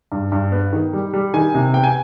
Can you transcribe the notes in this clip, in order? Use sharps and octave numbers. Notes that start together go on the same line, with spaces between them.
G2
G2
B3
D#3
G3
G3
D#3 G#5
C3
B3 G5
G#5